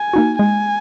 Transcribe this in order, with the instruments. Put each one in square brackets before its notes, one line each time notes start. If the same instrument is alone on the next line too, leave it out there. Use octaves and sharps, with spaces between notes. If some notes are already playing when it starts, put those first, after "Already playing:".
Already playing: [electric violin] G#5
[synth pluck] A#3 D#4 F#4
[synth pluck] G#3 [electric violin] G#5